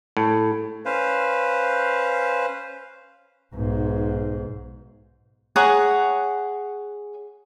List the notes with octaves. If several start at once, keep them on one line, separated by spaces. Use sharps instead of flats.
A2
C#4 B4 C5 F5
B1 G#2
G#4 C#5 F#5 A#5